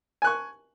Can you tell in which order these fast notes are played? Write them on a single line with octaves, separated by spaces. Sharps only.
G#5 F#6 C#6